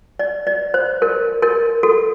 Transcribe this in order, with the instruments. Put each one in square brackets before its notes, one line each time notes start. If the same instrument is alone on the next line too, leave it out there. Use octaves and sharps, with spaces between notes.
[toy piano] D5
D5
C5
A#4
A#4
A4